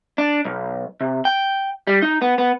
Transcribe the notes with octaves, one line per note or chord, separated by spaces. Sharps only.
D4
B1
C3
G5
G3
D#4
B3
B3